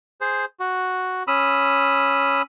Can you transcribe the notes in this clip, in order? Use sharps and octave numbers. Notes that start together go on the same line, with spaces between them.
G#4 C5
F#4
C#4 B5 D#6 E6